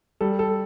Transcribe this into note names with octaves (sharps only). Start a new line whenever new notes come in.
G3 A4
A4